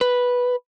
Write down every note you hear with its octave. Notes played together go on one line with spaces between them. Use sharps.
B4